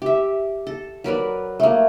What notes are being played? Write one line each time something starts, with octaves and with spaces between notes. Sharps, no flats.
G4 E5
A4
F#3 A#4 B4 D5
A3 A#3